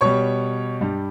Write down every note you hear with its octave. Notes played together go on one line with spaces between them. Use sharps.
B2 G3 C#5 C#6
G2 G3